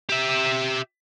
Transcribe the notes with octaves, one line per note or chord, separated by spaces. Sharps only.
G4 E5